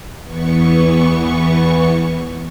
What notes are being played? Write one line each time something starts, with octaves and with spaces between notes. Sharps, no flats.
E2 E3 B3 C#6